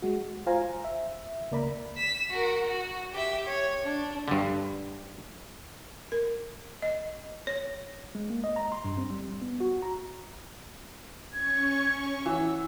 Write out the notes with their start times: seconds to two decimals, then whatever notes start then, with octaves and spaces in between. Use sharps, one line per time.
0.02 G#3 F#4
0.46 F4 C5 F5 G#5 A#5
0.84 E5
1.51 C#2 A#3 A#4 D5 A#5 B5
1.97 B6 E7
2.30 F#4 A#4
2.67 F#4
3.13 G4 E5
3.47 C#5
3.84 D4
4.28 G2 D3
6.12 A#4
6.82 D#5
7.47 C#5
8.15 G#3
8.30 A#3
8.44 D#5
8.56 A#5
8.72 C6
8.85 G2
8.98 C4
9.10 G3
9.29 A1
9.42 B3
9.60 F#4
9.83 A#5
11.32 C#4 C#6 G#6
12.26 E3 C#5 F#5 E6